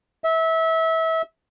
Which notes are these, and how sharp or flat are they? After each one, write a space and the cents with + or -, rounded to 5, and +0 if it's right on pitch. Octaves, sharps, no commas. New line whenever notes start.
E5 -25